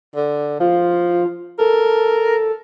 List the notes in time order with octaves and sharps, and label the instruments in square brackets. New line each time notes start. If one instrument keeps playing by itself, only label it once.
[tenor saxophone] D3
[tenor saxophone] F3 [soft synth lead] F4
[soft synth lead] A4 [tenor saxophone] A#4